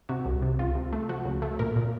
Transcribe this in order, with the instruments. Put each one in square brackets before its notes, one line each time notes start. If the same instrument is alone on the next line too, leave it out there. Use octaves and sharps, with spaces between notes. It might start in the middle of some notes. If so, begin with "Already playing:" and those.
[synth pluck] C3 F#4
C2
C3
C#2 F4
C3
A3
F3 F#4
C#2
A3
A#2 A#4
A#2